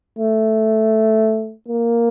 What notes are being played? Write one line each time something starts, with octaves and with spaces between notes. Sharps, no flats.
A3
A#3